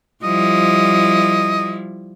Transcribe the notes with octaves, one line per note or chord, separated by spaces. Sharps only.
F3 G3 E4 D#5